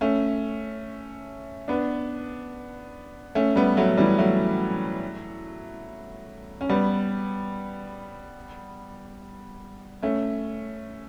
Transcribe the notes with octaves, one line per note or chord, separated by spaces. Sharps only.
A3 C#4
B3 D4
A3 C#4
G3 B3
F#3 A3
E3 G3
F#3 A3
C#4
G3 B3
A3 C#4